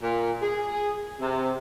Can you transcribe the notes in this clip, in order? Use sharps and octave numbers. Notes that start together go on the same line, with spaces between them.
A#2
G#4
C3